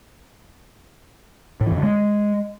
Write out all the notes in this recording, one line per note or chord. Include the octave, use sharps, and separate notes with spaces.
A2
E3
F2
D3
G#3